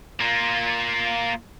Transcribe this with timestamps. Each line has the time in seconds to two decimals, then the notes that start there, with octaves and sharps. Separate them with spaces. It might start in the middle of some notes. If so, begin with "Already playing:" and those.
0.20 A#3 F4